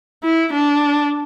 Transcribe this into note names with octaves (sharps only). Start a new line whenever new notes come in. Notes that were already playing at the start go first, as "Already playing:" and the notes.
E4
D4